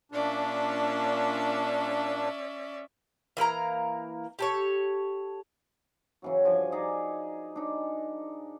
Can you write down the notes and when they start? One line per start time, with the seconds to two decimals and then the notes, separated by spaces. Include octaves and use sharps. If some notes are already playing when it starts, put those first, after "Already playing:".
0.12 A#2 C#4 D4 D5 E5
3.37 E3 A#3 A#4 A#5
4.39 G4 A4 C#5
6.22 C#3 E3 F#3
6.45 G2 F3 G#5
6.72 D#4 G#4 D5 A#5
7.56 D4 D#4